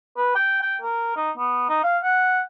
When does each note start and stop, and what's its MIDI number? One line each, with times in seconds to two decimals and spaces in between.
0.17 0.32 71
0.35 0.62 79
0.62 0.76 79
0.81 1.12 70
1.16 1.31 63
1.37 1.65 59
1.69 1.81 63
1.84 1.98 77
2.03 2.41 78